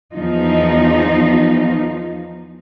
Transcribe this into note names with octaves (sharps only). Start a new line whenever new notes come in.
E2 F3 D#4